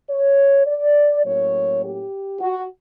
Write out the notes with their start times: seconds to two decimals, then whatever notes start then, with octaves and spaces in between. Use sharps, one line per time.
0.10 C#5
0.66 D5
1.24 A2 F#3 A#3 C#4 C#5
1.82 G4
2.40 F#4